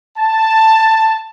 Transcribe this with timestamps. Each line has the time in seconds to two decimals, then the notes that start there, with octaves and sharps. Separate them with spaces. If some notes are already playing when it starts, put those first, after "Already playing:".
0.18 A5